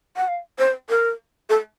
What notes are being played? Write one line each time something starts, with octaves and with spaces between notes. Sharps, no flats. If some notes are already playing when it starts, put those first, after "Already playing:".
F#5
F5
C5
A#4
A4